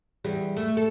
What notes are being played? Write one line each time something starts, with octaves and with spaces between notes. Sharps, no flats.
E2 G3 G#4
A3
A4